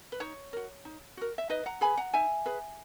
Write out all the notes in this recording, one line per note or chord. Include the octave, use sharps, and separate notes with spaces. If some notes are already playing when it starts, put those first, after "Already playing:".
B4
D#4 C#5
F#4 A#4
D#4
F#4 A#4
E5
D#4 B4 D#5
F#5 A#5
G#4 B4 G#5 B5
F#5 A#5
D#4 E5 G#5
G#4 B4